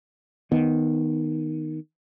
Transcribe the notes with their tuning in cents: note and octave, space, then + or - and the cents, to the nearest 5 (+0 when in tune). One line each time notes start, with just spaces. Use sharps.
D#3 +0 B3 +0